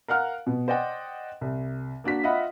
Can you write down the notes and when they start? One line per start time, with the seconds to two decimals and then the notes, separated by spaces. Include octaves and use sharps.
0.08 A#4 F5 F#5 F6
0.47 B2
0.68 C5 D5 D#5 F#5 G5
1.41 C2
2.04 A#3 D4 F#4 B6
2.23 F4 D#5 E5 F#5 B5